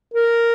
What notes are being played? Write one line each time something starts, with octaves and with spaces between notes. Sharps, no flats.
A#4